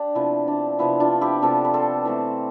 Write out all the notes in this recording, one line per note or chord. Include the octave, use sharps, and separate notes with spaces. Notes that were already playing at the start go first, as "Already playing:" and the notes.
Already playing: D4 G4
C3 F3 B3 E4
D4
C3 F3 B3 E4
D4 F4
E4 G4
C3 F3 B3 F4 A4
B4
A4 C5
E3 A3 C4